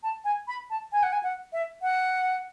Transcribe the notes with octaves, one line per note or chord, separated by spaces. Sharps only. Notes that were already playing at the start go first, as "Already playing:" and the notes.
A5
G#5
B5
A5
G#5
F#5
G#5
F#5
E5
F#5